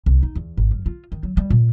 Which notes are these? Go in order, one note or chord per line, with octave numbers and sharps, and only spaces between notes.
C2
D#4
E2
G#1
F#2
F4
D#3
F#3
G3
A#2